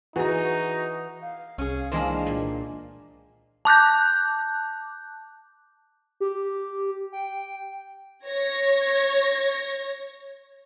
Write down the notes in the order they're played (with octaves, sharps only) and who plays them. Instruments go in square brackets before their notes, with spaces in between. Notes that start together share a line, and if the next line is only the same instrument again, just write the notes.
[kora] E3 [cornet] D#4 [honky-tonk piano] F#4 [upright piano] G#4 A#5
[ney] F5
[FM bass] C2 [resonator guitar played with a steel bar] C#4 G#4
[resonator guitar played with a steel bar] D#3 A#3 C5 [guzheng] E3 G#3 D4
[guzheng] A#2
[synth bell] A5 D6 F#6 G6
[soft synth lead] G4
G5
[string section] C#5 G#6 A#6